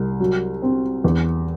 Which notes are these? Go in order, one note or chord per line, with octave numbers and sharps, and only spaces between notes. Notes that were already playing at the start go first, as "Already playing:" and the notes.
Already playing: C2
F#3
C4
E2